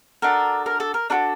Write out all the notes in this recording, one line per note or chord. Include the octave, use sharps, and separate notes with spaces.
D4 F#4 A4 A#4
A#4
A4
A#4
D4 F#4 A4 A#4